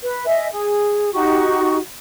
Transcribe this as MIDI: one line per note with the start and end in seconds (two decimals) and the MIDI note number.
0.02 0.27 71
0.27 0.47 75
0.27 0.47 76
0.27 0.47 80
0.52 1.11 68
1.13 1.78 63
1.13 1.78 66
1.13 1.78 67
1.13 1.78 85